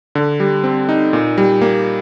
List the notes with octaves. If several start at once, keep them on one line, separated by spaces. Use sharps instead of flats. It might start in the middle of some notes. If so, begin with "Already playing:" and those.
D3
G3
C4
D#4
A#2
G3
A#3